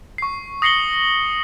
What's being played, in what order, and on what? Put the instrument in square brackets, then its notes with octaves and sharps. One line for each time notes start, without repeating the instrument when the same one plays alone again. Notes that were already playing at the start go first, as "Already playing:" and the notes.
[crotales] C#6 C7
D#6 A#6 C7 C#7 F#7 G7